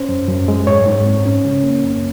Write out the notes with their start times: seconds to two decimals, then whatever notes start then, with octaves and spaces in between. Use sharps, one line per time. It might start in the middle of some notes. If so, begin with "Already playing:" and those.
Already playing: C#4 C5
0.09 F#2
0.28 F#2
0.48 G#3
0.67 G#2 C#5
0.86 G#2
1.05 C4
1.26 C#4
1.45 C#3
1.63 A#3
1.83 F#2